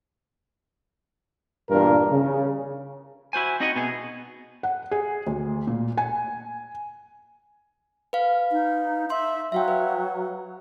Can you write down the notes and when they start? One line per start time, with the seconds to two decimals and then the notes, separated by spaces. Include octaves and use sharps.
1.70 E2 G2 A#2 D4 A#4
2.12 C#3
3.33 E4 F#4 C5 G#5
3.60 C4 D#4 F#4 D#5 F#5 G#5
3.76 B2 B3 G#4
4.63 F#5
4.91 G#4
5.27 D2
5.67 A#2
5.97 G#5
8.13 B4 F5
8.52 D#4
9.10 E5 C6
9.52 F#3 E5 F5 G5
9.68 B4